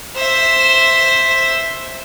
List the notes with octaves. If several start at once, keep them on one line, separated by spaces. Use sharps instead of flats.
C5 E5